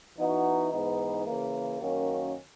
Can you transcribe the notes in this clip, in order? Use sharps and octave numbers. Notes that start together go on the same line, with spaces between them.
E3 B3 D#4 F#4
G#2 E3 B3 D#4
C#3 E3 A#3
F#2 D#3 A#3 C#4 F#4